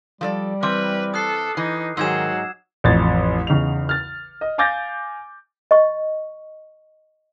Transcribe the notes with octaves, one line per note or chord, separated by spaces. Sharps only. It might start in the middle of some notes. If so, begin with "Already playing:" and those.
F3 G3 A4 D5
E3 C4 B4 D6 F6
A4 D#6 F#6 C7
E3 D#4
G#2 D#3 F#3 D#4 G#4 E6 G#6 E7
A1 F2 G#6 A6
E2 C#3 D#4 F7
F6 A6
D#5
F5 G#5 D6 G6 A6 A#6
D#5 C#6